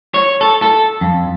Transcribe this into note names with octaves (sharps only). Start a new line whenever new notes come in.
C#5
A4
A4
F2